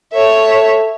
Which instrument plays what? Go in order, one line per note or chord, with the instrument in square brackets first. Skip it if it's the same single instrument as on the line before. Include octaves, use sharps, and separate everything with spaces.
[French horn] A4 [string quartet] C#5 E5